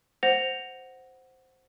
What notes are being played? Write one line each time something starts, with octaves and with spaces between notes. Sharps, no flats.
C5 F#5 A#6 F7